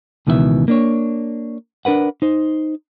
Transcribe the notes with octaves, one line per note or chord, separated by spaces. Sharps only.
C#2 B2 D#3 E3 G#4 E5
A#3 D4 C#5
D4 A#4 B4 F#5
D#4 C5